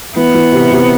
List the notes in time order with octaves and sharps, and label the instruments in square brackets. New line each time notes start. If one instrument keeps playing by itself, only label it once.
[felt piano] E3 [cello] B3
[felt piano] E3
C3
C3